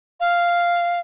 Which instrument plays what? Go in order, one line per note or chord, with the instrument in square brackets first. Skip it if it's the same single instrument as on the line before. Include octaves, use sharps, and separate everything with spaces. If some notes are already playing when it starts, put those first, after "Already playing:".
[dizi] F5